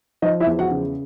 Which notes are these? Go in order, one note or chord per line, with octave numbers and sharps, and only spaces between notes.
F3 D#4 D#5
E4 E5
E2
F#4 F#5
C#3